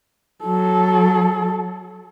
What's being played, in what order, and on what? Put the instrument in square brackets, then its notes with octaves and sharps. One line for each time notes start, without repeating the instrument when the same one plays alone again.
[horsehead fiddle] F#3 A4